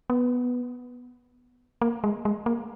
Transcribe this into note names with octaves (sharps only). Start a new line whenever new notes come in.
B3
A#3
G#3
G#3
A#3